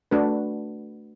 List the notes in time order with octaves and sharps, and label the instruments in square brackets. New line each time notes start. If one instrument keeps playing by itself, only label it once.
[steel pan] A3 D4 F#4 B4